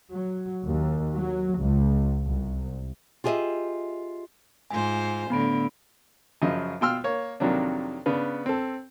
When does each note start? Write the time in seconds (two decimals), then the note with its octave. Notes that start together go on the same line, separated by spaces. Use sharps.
0.14 F#3
0.66 D#2
1.17 F#3
1.61 C#2
2.25 C2
3.24 F4 G4 G#4 B4 D#5 E5
4.71 G#2 F4 C5 G#5
5.30 A2 D3 B3 B5 D7
6.42 F#2 C#3 F3 D#5
6.81 B2 F4 G5 C6 E6 F6
7.04 A#3 C#5
7.40 F2 C3 D#3 F#3 A#3 D4
8.06 C#3 B3 D4 B4
8.46 C4 A4